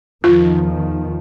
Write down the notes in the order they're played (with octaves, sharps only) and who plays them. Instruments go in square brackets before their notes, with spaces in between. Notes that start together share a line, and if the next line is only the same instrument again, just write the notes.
[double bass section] E2 D#3 F3 [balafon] F4